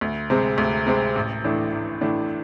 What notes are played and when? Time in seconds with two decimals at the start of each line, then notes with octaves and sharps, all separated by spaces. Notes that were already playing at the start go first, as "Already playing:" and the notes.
0.01 D2
0.30 C3 G#3 C4
0.58 D2
0.86 C3 G#3 C4
1.16 A1
1.44 A2 E3 A3 D4
1.73 A1
2.01 A2 E3 A3 D4